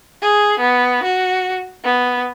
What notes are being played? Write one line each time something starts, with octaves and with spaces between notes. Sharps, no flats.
G#4
B3
F#4
B3